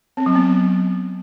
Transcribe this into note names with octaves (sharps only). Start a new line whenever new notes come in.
C4
F#3
B3